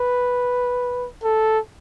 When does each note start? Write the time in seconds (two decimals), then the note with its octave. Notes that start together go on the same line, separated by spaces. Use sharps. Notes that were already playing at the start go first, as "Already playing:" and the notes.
Already playing: B4
1.23 A4